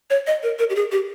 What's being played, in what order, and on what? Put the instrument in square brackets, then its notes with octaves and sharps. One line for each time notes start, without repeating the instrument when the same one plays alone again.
[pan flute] C#5
D#5
A#4
A#4
G4
G#4
G4